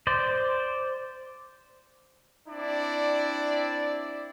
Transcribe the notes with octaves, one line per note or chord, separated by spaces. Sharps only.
C5 D5
C4 D4 E4 D5